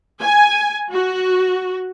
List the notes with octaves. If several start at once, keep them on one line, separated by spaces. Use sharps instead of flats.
G#5
F#4